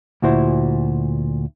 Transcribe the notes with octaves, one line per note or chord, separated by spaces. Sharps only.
D2 A#2 E4 F#4 C5